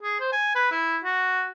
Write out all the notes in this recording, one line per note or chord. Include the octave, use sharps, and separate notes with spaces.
G#4
C5
G#5
B4
E4
F#4